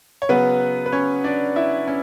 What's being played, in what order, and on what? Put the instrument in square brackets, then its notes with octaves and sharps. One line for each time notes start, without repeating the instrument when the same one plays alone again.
[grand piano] C#5
C#3 F#3 B3 B4
B4
C#4 C#5
D4 D5
E4 E5
C#4